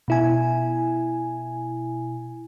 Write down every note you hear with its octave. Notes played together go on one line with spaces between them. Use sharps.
B2 E4 G#5